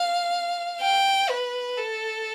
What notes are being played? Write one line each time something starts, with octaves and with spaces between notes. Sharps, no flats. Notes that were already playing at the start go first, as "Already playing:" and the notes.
Already playing: F5
G5
B4
A4